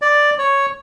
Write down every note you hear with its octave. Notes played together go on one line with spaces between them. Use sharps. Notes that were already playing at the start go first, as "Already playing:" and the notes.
D5
C#5